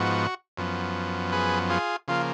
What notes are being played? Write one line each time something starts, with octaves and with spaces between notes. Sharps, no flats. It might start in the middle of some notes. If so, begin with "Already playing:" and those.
Already playing: G#2 F3 B3 F#4
F#2 F3 B3
G#4 B4
F4 G#4
C#3 F3 A#3 F4